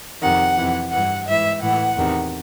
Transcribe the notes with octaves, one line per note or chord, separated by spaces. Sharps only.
F2 C3 D#3 F#5
F2 C3 E3
G2 E3 F#5
G#2 E3 E5
A2 E3 F#5
E2 C3 D#3